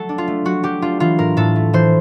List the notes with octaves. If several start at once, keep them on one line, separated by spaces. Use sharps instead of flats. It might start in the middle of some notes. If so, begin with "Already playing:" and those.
Already playing: F#3 A3 A4
D4
F4
A3
F#3 F#4
F#3 G4
D4 F4
E3 F4
A2 A#4
A2 A4
A3
E3 C5